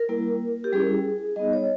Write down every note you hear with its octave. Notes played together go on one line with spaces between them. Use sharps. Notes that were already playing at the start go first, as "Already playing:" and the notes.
Already playing: A#4
G3 A#3 E4
G4
G3 C#4 E4 G#4
G3 B3 D#4 D#5
C#5